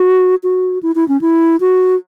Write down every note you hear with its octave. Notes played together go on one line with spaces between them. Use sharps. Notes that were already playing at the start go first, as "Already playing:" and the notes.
Already playing: F#4
F#4
E4
E4
C#4
E4
F#4